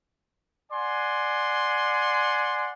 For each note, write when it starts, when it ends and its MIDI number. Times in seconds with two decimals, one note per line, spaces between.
0.72 2.73 74
0.72 2.73 78
0.72 2.73 80
0.72 2.73 84